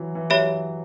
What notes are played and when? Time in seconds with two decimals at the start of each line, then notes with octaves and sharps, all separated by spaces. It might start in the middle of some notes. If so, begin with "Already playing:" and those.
Already playing: E3 F#3
0.15 E3
0.30 F#3 G4 C#5 E5 B5